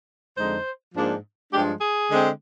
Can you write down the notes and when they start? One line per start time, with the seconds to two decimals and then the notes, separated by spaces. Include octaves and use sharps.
0.37 F2 D3 G#3 D#4 C5
0.95 G#2 F3 A#3 D4
1.52 G2 F3 G#3 D4 G4
1.81 G#4
2.09 D3 G#3 C4